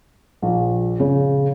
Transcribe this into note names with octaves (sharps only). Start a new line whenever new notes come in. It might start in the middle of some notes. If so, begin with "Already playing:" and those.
A#1
C#3